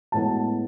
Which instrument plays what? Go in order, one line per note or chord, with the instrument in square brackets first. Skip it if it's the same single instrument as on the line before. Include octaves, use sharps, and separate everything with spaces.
[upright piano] A2 G#3 B3 A5